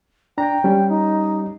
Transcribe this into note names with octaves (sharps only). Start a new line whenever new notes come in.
D4 G5 A#5
G3 C#4 G4
D#4